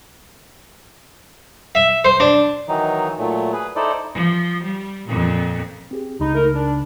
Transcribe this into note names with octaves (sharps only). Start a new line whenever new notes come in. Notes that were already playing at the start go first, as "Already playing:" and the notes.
E5
C5
D4
D#3 E3 F#3 D#4
A#2 F#3 A3
G#4 B4
D#4 E4 A4 C5 D5
F3
G3
F2 A#2
C4 G4 G#4
C#2 C#3 D#4 B5
A3 D#4 A#4
D4